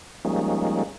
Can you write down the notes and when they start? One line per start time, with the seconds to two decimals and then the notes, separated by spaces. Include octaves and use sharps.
0.25 F3 G3 G#3 A#3 C#4 D#4